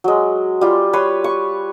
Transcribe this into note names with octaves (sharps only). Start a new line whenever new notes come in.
F#3 G#3
G3 F4
B4 C#5 C6 C#6
C#6